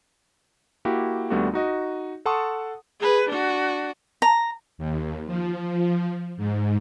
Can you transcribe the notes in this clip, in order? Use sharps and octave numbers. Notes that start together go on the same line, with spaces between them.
A#3 E4 F#4 G4
D#2 G3 A3 B3 D4 F#4
D#4 F#4 D#5
A4 F#5 A5 C6 C#6 D#6
G#4 B4
D4 F#4
A#5
D#2
F3
G#2